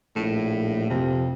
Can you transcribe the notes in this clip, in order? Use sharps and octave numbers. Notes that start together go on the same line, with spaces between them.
A#1 A2
F2 C3